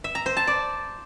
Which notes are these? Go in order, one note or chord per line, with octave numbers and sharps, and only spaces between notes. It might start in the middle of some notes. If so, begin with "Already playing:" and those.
E5
A#5
C5
A5
D5